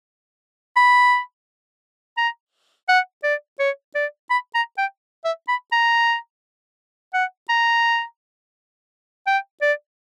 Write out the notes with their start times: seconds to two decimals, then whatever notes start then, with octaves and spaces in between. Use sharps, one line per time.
0.76 B5
2.17 A#5
2.88 F#5
3.24 D5
3.59 C#5
3.95 D5
4.30 B5
4.54 A#5
4.78 G5
5.24 E5
5.48 B5
5.72 A#5
7.14 F#5
7.49 A#5
9.27 G5
9.61 D5